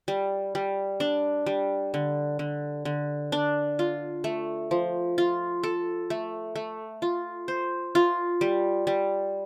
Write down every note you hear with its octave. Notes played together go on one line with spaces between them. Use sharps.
G3
G3
D4
G3
D3
D3
D3
D4
F4
A3
F3
F4
A4
A3
A3
F4
C5
F4
G3
G3